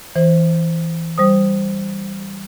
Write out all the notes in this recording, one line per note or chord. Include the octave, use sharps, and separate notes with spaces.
E3 C5
G3 C5 D#6